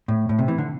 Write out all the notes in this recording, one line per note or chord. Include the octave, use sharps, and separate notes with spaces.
A2
A2
C3
E3
D3